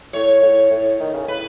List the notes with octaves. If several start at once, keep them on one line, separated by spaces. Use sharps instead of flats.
A2 C#5
A2
A2
D#3
C#3
A2 B4